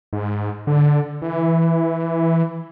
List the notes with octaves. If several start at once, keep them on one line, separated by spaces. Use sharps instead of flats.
G#2
D3
E3